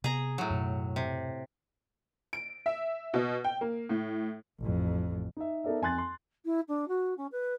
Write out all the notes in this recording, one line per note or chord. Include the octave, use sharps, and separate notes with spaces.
C3 B3 G#4 A#5
A2 F#3
F#2 B2 A3
C3
D7
E5
B2
G5
A#3
A2
A1 F2
D#4 E5
B3 D#4 A4 A#4 D5 E5
F2 G#5 C6 F#6 A6
C6
E4
D4
F#4
C#4
B4